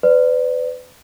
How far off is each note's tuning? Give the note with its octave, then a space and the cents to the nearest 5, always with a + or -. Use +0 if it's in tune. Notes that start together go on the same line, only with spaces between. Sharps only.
B4 +35 D5 +0